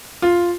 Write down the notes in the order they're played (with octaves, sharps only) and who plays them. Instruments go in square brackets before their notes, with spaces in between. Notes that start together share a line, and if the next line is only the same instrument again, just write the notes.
[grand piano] F4